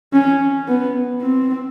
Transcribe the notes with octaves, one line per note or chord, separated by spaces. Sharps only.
C#4
B3
C4